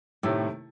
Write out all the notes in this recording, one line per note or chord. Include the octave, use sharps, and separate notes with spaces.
A2 C3 D#3 A3 E4 G4